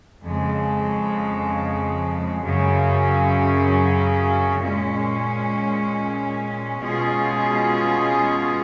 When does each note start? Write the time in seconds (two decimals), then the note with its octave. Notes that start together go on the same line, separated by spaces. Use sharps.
0.23 F2 C#3 G#3
2.42 F#2 C#3 F#3 C#4
4.61 A#2 G#3 C#4
6.80 B2 G#3 C#4 F4 G#4